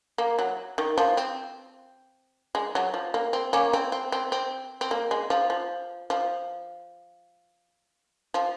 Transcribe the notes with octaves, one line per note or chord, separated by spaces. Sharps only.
A#3
F#3
D#3
F3
C4
G#3
F#3
F3
A#3
C4
A#3 C#4
C4
C4
C4
C4
C4
A#3
G#3
F3
F3
F3
F3